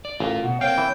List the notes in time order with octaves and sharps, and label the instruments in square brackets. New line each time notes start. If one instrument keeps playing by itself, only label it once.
[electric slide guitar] D5
[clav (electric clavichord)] A1 [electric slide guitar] F4 A#4 F5
[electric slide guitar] B2 [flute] F#5
[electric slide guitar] A#3 C4 [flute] C#5 [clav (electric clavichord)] F5 [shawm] G5
[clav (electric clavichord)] E3